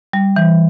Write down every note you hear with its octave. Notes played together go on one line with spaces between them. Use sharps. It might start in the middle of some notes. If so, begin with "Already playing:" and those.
G3
E3